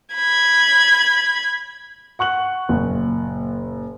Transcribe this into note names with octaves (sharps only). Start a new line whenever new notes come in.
B5 G#6
F#5 C#6 F#6 F#7
F#1 A#2